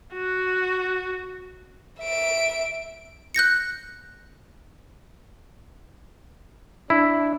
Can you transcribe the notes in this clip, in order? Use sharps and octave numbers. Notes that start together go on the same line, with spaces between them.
F#4
E5 D7
F#6 G6 A#6 C#7
D4 E4